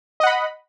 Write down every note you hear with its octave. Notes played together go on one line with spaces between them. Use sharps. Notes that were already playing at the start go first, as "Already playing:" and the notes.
D#5 F#5 B5